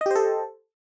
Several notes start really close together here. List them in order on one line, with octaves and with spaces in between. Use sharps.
D#5 G4 C5 A4